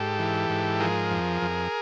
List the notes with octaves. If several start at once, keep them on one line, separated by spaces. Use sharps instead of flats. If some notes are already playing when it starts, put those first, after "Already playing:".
Already playing: G#2 G4 A4
E3
G#2
F3 G#4 A#4
F2
F2